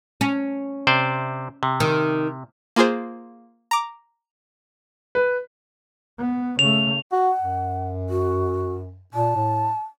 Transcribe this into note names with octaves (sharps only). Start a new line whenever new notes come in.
C#4
C3 C5 D5
C3
D#3
A#3 F4 G#4 C5
A#5 D6
B4
B3
C#3 A3 F7
F#4 F#5
F#2
F#4
A#2 A5
A2